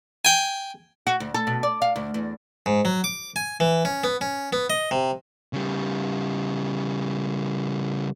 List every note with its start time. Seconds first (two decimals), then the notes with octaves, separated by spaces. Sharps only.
0.25 G5 G#5
1.07 F#4
1.20 D2
1.34 A4
1.47 B2
1.63 D5
1.82 F5
1.96 D2
2.14 E2
2.66 G#2
2.85 F#3
3.04 D6
3.36 G#5
3.60 E3
3.85 C#4
4.04 B3
4.21 C#4
4.53 B3
4.70 D#5
4.91 C3
5.53 C#3 G3